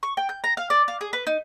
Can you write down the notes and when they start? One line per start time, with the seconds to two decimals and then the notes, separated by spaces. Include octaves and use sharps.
0.03 C#6
0.17 G5
0.29 G6
0.44 A#5
0.57 F5
0.70 D5
0.88 F5
1.01 G#4
1.13 B4
1.27 D#4